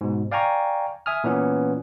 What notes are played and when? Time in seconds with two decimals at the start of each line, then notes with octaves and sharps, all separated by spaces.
0.01 G#2 B2
0.31 D5 F5 G5 G#5 A#5 C#6
1.06 E5 G#5 D#6 F6
1.24 A#2 E3 B3 C#4